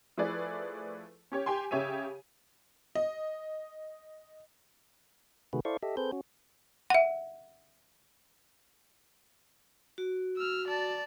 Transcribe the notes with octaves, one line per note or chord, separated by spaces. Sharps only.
F3 A3 E4 G#4 B4 D5
C#4 G4 C#5
G4 G5 G#5 C6
C#3 G4 C#5 E5 D#7
D#5
C3 D#3 A3 F#4 G#4 B4
E4 A4 C5 D5 F5 C#6
G4 A4 D#5 E5
C4 G#4 A4 B4 C5 G6
C#4 F#4
E5 F#5
F#4
E6 F6
D5 A5